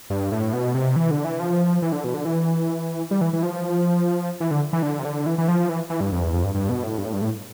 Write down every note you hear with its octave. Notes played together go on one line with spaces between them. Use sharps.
G2
A2
B2
C3
E3
D3
E3
F3
E3
D3
B2
D3
E3
G3
E3
E3
F3
E3
D3
E3
D3
C3
D3
E3
E3
F3
E3
E3
G2
F2
E2
F2
G2
G2
B2
A2
G2
A2
G2
A2